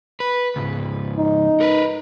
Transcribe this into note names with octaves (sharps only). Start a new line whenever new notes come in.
B4
C#2 G#2
D#4
A#4 B4